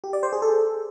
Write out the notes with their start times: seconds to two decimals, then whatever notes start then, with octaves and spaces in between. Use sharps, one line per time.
0.04 G4
0.13 D5
0.23 C5
0.33 G#4
0.42 A4